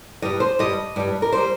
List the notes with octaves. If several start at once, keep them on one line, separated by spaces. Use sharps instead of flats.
G2 G3 D#5
C5
G2 G3 D#5
G2 G3
A#4
G3 C5